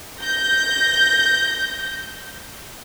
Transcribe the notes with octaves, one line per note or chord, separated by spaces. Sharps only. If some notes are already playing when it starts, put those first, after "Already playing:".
G6 A#6